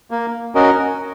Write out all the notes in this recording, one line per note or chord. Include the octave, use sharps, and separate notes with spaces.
A#3
C#4 F#4 A#4 D#5